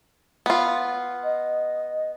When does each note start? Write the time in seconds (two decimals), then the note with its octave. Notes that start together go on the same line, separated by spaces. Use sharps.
0.46 B3 F4
1.24 D#5